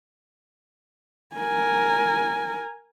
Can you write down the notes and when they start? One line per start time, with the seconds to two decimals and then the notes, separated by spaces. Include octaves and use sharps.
1.36 A#4 G#5